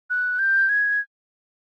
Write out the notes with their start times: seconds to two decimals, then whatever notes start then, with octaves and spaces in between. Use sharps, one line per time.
0.10 F#6
0.39 G6
0.69 G#6